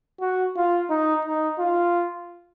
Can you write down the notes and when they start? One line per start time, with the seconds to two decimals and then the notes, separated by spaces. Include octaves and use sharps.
0.21 F#4
0.57 F4
0.90 D#4
1.25 D#4
1.59 F4